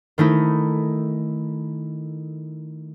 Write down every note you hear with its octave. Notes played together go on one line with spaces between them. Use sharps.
D#3 A3 D#4 E4